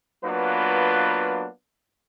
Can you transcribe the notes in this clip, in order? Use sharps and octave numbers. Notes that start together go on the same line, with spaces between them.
F#3 A#3 B3 D4 F4 B4